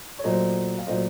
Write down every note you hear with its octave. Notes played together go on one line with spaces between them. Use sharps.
C#5
A#2 F#3 A3 C5 D#5
F5
A#2 F#3 A3 C5 D#5